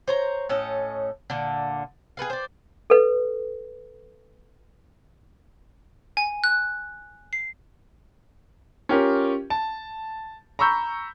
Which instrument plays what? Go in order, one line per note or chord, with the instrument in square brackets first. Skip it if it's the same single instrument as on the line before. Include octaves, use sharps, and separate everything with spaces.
[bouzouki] C5 C#5 A#5
A2 C#4 A4 D#5
A#2 D3
G#4 A4 B4 F5
C5 D5
[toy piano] A4 B4
[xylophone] G#5
F#6
C7
[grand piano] C#4 F4 G4 A#4
A5
A#5 B5 C#6 E6 G6